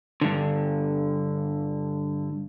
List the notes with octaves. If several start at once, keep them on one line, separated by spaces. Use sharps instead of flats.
G2 D3